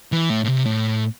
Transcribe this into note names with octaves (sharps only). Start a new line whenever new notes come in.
E3
A2
A2
C3
A2